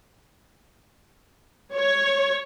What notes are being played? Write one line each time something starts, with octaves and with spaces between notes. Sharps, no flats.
C#5